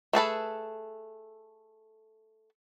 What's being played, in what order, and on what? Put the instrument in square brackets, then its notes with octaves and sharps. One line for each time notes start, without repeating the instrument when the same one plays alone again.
[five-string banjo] A3 G#4 A4 B4